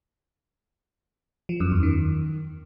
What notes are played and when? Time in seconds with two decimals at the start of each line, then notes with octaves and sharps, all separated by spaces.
1.49 F3
1.60 F#2
1.72 E2
1.83 D#3